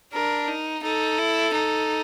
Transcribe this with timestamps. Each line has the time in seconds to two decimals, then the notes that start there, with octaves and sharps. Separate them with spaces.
0.13 D4 A#4
0.48 D#4
0.83 D#4 A4
1.19 E4
1.55 D#4